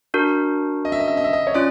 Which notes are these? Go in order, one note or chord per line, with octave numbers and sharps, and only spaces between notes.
D4 F#4 A#4
D#5
E5
D#5
E5
D#5
E5
D#5
C#5
C#4 F4 D5